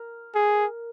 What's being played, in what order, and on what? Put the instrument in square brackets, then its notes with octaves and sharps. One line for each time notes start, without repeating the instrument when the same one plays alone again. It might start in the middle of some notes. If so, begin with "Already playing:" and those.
Already playing: [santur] A#4
[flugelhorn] G#4